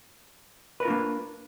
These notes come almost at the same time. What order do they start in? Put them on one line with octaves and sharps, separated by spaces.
B4 A#4 F4 D4 A#3